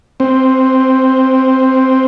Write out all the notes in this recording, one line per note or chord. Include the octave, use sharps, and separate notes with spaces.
C4